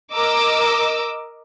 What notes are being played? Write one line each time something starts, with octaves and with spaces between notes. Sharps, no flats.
A#4 D#5 D6 E6